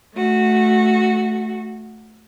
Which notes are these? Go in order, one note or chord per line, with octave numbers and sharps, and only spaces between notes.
A3 F#4